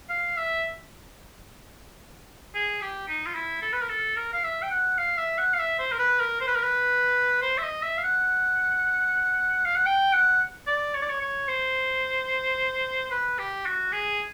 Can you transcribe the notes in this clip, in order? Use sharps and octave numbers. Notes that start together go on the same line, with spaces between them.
F5
E5
G#4
G4
D#4
F4
E4
A4
B4
A#4
A4
A#4
F5
E5
G5
F#5
F5
E5
F#5
F5
E5
C5
A#4
B4
A#4
C5
B4
A#4
B4
C5
E5
D#5
E5
F5
F#5
F5
F#5
G5
F#5
D5
C#5
D5
C#5
C#5
C5
B4
G4
F#4
G#4